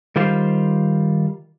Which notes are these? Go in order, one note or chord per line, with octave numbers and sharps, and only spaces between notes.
D#3 G3 F4 C5 F5